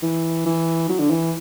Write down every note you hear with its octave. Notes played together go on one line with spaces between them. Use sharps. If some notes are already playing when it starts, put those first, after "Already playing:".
E3
E3
F#3
D3
E3